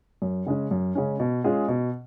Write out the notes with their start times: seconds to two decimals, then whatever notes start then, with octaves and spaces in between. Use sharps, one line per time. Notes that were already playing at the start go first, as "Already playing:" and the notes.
0.22 F#2
0.46 C#3 G#3 C#4
0.71 F#2
0.95 C#3 G#3 C#4
1.20 B2
1.44 G#3 C#4 F4 G#4
1.68 B2